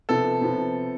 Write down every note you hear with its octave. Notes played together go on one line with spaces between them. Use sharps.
C3 F3 B3 A4
C3 F3 B3